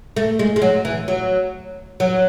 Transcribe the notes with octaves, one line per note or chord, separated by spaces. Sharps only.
A3
G#3
G#3
F#3
E3
F#3
F#3